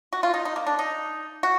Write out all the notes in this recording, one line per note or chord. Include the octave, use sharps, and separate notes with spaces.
F#4
F4
D#4
D#4
A#3
D4
D#4
F#4